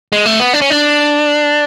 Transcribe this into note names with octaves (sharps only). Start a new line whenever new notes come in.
G#3
A3
B3
D4
C#4
D4